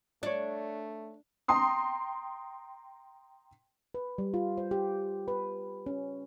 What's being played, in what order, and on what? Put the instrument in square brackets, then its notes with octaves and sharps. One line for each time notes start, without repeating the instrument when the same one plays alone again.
[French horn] A3 [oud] D4 [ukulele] C#5 D5
[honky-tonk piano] G5 A#5 C6 D#6
[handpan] B4
G3
F4
C5
G4
B4
C#4